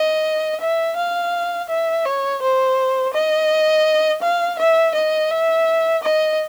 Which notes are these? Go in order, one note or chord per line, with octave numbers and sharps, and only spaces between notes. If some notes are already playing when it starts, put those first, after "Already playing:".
Already playing: D#5
E5
F5
E5
C#5
C5
D#5
F5
E5
D#5
E5
D#5